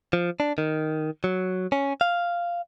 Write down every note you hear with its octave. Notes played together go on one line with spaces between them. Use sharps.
F3
D4
D#3
F#3
C#4
F5